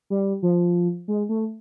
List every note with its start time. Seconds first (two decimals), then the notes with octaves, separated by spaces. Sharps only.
0.10 G3
0.42 F3
1.08 G#3
1.29 A3